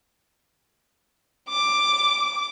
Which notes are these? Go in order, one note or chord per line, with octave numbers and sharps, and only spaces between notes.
D6